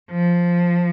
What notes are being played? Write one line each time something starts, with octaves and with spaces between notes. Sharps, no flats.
F3